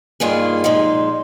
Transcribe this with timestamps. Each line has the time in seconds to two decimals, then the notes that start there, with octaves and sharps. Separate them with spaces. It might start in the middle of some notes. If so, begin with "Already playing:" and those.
0.20 G2 D#3 A#3 F4 G#4
0.64 A#2 F3 G#3 D#4